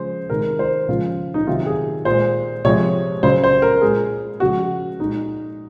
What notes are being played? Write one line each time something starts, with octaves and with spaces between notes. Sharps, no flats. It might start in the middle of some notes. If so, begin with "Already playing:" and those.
Already playing: C#3 F3 G#3 C5
C3 D#3 G#3 A#4
C5
C#3 F3 G#3 F4
D#4
C3 D#3 F#3 F4
G#4
A#2 G#3 C5
C3 F3 G#3 C#5
C#3 F#3 C5
C5
A#4
A#2 G#3 G#4
C#3 F3 G#3 F#4
A#2 G#3 D#4